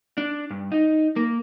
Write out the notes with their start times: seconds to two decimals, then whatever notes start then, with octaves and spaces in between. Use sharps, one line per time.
0.18 D4
0.50 G2
0.72 D#4
1.16 A#3